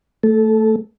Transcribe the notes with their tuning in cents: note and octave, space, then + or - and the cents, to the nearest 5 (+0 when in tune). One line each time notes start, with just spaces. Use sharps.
A3 +15 A4 -15